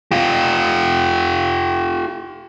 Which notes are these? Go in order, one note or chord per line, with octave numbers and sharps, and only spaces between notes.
F4 G4